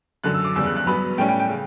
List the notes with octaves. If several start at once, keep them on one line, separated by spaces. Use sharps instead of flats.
F#2 D3 F#3 F#6
E6
D6
E2 C#3 G3 E6
F#6
F#6
G2 F#3 B3 B5
A2 G3 C#4 G5
G5
G5
C#3